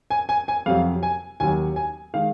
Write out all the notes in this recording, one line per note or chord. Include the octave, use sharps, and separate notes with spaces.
G#5
G#5
G#5
F2 C3 F#3 F5
G#5
D#2 D#3 F#3 G#5
G#5
D#3 G#3 F5